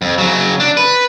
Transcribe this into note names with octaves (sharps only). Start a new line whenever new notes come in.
F2
C#3 F#3
D4
B4